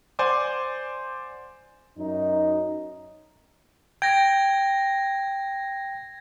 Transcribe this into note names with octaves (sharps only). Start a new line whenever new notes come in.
C5 D5 F#5 G#5 D6
F#2 D#4
G5 G#6 A#6